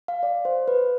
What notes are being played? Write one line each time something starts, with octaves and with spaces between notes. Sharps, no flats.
F5
D5
C5
B4